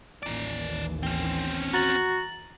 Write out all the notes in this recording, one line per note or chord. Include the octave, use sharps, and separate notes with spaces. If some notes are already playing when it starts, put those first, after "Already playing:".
A1 D#2 E3 D#4 D5
C4 C#4
F#4 A#5 A6 F#7